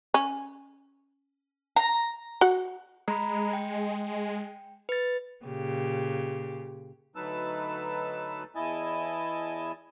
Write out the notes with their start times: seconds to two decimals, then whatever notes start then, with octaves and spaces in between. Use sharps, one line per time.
0.14 C#4
1.76 A#5
2.41 F#4 F#5
3.08 G#3 A#5 B5
3.53 G5
4.89 B4 A6
5.45 A#2 C#3 G4
7.16 D2 F#3 D#4 B4 A5 E6
8.55 E2 E4 D#5 G#5 A5